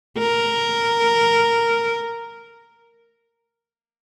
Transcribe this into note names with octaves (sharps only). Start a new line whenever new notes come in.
A#4